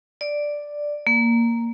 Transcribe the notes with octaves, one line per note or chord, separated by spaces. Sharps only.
D5
A#3